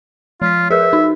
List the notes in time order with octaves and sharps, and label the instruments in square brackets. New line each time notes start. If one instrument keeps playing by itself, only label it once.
[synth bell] F3 B6 [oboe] F4
[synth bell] G#4 A#4 B4 [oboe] E5
[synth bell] D#4